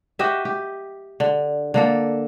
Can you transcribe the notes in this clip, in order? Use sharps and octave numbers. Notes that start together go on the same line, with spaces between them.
F#4 G4 D#5 E5
G4
D3
D3 A#3 A4